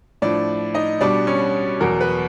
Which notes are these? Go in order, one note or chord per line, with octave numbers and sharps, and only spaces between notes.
A2 F3 D4 D5
D#4 D#5
B2 G3 D4 D5
C#4 C#5
E2 B2 F#3 A#4
B4